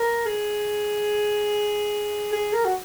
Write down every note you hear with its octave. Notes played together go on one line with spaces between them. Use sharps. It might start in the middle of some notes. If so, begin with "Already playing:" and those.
Already playing: A#4
G#4
G#4
A#4
F#4